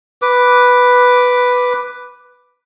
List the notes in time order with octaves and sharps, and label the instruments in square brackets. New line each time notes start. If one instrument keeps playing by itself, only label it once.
[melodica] B4 D6